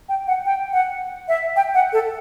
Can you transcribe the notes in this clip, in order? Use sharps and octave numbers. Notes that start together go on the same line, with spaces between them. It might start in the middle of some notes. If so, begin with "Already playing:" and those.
G5
F#5
G5
F#5
E5
G5
F#5
A4